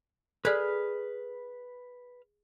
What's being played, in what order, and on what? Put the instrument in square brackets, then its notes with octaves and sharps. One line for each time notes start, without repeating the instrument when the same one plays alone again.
[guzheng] G#4 [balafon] A4 D5 [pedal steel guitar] B4 B5 F6